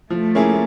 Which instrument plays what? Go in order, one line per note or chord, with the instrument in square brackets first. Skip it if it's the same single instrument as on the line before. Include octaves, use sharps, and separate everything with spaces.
[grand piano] F3 [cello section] A3
[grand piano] A#3 C#4 E4 G#4